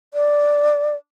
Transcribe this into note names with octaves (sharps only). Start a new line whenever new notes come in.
D5